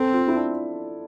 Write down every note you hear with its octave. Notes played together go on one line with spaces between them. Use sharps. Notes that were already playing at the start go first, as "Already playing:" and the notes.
Already playing: C4 A4
F4
E4
D4